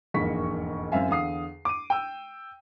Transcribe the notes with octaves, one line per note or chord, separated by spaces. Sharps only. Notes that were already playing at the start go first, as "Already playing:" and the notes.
E1 F2 G#2 A#3 C#6 B6
F#2 C4 E5 F5 G#5
E2 D3 F5 D#6 C7
D6 D#7
G5 E6